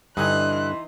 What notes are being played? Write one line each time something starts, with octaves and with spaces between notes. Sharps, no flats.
G2 D3 E3 D#4 E4 G#5 C6 F#6